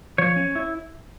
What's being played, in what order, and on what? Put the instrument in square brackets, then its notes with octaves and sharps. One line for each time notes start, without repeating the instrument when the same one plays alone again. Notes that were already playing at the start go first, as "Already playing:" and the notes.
[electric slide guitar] F3 C#5
C#4
E4